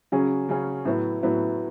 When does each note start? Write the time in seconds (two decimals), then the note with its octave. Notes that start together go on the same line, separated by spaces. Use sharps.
0.12 C#3 F#3 C#4 G#4
0.49 C#3 F#3 C#4 G#4
0.85 A2 F#3 B3 E4
1.23 A2 F#3 B3 E4